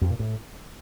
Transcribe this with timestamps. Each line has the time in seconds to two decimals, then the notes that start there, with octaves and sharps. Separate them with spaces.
0.02 F2
0.10 A#2
0.19 A2